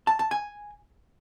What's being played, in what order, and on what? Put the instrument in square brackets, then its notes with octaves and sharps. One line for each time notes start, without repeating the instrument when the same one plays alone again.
[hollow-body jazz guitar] A5
A5
G#5